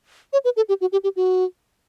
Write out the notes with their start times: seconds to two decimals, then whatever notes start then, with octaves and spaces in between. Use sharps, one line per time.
0.33 C#5
0.45 B4
0.57 A4
0.69 G4
0.81 F#4
0.92 G4
1.04 G4
1.16 F#4